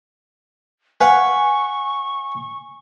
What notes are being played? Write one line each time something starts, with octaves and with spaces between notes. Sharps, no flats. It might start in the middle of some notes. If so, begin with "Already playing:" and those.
B4 F5 F#5 G#5 C#6